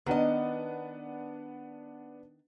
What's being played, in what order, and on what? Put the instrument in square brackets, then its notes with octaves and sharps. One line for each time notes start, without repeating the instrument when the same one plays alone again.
[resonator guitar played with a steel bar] D#3 D#5 [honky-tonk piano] B3 D4